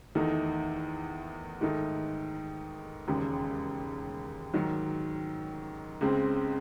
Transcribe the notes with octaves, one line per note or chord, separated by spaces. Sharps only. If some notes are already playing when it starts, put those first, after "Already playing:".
E2 D#3 A3 D#4
G#2 D#3 A3 D#4
E1 D#2 C#3 G#3
G#2 D#3 F#3
C#2 C#3 G#3 C4